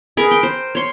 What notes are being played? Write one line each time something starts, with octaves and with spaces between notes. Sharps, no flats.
G#4 A#4 B4
G5
C5
C#5 C6